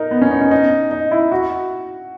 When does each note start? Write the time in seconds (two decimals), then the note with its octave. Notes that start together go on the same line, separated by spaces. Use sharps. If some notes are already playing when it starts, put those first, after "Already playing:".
Already playing: D#4 A#4
0.11 B3
0.22 C#4
0.31 D#4
0.41 C#4
0.51 D#4
0.91 D#4
1.11 E4
1.32 F#4